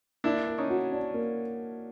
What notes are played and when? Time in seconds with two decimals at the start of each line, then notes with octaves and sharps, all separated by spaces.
0.24 A#3 D4 E4
0.47 A#4
0.58 C#4 D#4
0.69 F#4
0.91 D4
1.14 A#3